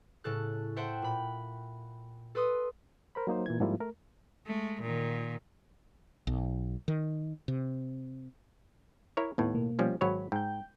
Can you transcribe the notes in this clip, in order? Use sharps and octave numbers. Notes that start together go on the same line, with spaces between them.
A2 C#3 A4 F#6
C5 E5 F#5 G5 A5 C6
A#2 B5
A4 B4 C6 D#6
A#4 C5 B5
F#3 A#3 D#4 C5
A#2 E3 G#6
G#2 F3 G3 A#3 E4 F4
A3 A#4
G#3 A3
A#2 D#3
B1
D#3
C3
E4 A#4 C#5
D#2 A2 B3
B2 A#3
F3 G3 C#4
G#1 F#3 C#5 B5
G#2 G5 G6